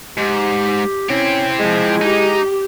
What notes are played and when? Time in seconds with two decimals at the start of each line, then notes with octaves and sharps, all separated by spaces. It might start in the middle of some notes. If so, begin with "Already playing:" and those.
0.17 G#2 G4
1.10 C4 C#4 E4 G4
1.59 F3 G#3
2.01 D#4 G4